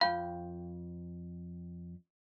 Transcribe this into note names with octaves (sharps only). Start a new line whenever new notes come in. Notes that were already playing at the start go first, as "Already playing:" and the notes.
F2 F5 G5 B5